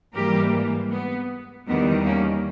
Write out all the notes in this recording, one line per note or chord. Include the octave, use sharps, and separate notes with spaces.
G#2 E3 G3 A#3 G4 A#4
B3
E2 D#3 G3 B3
A#3 C#4